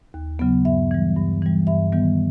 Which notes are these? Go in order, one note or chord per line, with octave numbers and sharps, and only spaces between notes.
D#2
C#3 F#3 B3
G2 E5
E3 G3
G2
E3 G3
G2 E5
D#3 G3 B3